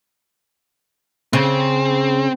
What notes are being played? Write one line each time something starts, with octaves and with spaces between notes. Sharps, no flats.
C#3 C4